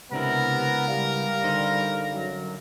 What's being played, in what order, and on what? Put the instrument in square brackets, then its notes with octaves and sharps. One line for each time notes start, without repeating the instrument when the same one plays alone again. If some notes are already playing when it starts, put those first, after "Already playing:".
[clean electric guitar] C#2 D4 E4 [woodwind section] C3 [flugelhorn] B3 [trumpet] A#4
[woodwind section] G3 [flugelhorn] F5
[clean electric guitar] D3 D#4 C5
[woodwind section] F#2 F#3